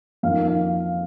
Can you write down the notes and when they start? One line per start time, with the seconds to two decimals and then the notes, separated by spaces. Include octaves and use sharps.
0.23 F2 D#3 A#3 F5
0.48 F5